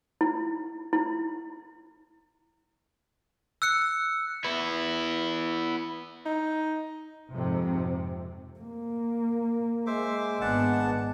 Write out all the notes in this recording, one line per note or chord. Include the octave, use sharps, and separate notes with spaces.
E4
E4
E6 F#6 C#7
B3 E4
D#4
F2 G#2 C3 C4
A#3
G#3 C5 E5 D6
G#1 B3 D4 F#5 A5